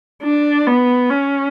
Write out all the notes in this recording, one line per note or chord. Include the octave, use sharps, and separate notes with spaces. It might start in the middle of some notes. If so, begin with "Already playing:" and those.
D4
B3
C#4